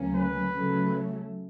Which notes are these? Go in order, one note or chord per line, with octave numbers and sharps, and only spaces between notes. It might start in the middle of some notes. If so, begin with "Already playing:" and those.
Already playing: D2 C#3 F#3 A#3 C#4
B4
C#3 F#3 A3